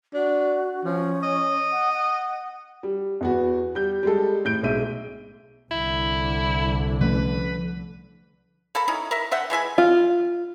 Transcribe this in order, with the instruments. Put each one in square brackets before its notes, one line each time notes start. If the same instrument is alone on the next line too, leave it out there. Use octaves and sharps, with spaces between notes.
[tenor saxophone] D4 [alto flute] F#4
[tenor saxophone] F3 [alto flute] C#4
[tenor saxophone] D#5
[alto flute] F#5
F#5
[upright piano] G3
E2 B3 F#4
G3 G6
G3 G#3 A4
A2 G6 D7
B1 G#3 E5 D#7
[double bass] C2 D3 [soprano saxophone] E4
[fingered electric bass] F3 A3 C#4 [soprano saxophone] B4
[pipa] A#3 A4 B5
C#4 D#4 E4 B5
A#4 E5
D3 E5 F#5 G5
E3 G#3 E5 G#5
[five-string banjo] F4